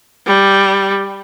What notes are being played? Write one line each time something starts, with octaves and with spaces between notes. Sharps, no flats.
G3